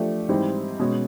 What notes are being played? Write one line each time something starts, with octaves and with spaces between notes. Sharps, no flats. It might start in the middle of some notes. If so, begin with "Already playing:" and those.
Already playing: F3 A3 D4 G4
G#2 E3 G3 C4 E4
B2 G#3 C#4